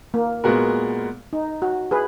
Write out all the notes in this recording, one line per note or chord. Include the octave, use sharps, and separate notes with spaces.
A#3
A#2 G#3 B3 F#4 A#4
D#4
F#4
G#4 B4